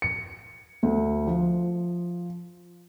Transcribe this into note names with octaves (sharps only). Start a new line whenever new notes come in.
C#7
D2
F3